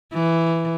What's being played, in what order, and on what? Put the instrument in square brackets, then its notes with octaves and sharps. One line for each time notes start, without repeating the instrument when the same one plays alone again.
[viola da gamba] E3